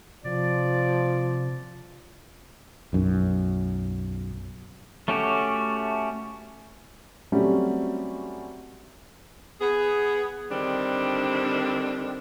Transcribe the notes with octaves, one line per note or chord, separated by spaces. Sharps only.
C3 F3 D5
B1 F#2
A3 C#4 F#4 G4
F#3 G3 A3 C4 C#4
B3 G#4
D3 D#3 G3 C4 D4